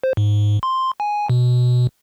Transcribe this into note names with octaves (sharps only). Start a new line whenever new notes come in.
C5
G#2
C6
G#5
B2